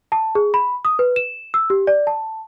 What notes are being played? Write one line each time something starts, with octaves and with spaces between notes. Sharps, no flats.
A5
G#4
B5
D#6
B4
E7
E6
G4
D5
A5